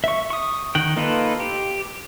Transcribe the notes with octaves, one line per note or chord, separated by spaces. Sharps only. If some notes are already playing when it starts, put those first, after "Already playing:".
E5 C#6
C#6 D#6
D#3 F#5 G5
A#3 D#4 F4 A4 B4
G4